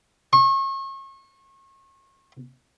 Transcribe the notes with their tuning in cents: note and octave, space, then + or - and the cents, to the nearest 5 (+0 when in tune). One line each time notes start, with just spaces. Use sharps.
C#6 -35